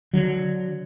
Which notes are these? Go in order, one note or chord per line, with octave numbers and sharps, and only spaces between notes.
D3 F#3